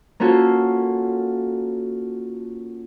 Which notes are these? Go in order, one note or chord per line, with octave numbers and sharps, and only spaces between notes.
A#3 C#4 F4 F#4 A4